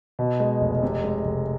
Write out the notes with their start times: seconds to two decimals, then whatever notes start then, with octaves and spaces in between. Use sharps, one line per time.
0.19 B2
0.40 G#3
0.61 F1
0.83 C3
1.04 G#3
1.25 F1